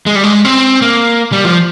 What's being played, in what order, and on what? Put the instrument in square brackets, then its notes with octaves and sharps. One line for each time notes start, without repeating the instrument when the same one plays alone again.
[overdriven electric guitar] G#3
G3
G#3
C4
A#3
G3
F3